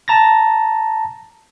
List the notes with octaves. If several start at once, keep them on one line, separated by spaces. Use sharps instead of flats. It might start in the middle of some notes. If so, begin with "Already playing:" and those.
A5 A#5 A6 A#6